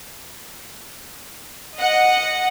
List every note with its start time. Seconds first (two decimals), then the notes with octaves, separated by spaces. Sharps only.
1.78 D#5 F#5